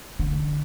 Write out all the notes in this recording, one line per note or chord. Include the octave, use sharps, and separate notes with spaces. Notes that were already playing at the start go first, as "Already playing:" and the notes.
D3